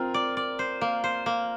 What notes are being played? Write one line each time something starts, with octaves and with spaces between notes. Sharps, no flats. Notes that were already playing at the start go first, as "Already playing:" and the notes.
Already playing: C4 F4 A#4
D5
D5
C5
A#3
C5
A#3